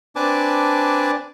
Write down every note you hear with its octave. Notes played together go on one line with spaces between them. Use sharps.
C4 D4 B4 G#5 A5 D6